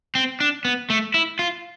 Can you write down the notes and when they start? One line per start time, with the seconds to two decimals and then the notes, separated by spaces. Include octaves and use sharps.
0.15 C4
0.40 D4
0.65 B3
0.90 A3
1.14 E4
1.39 F4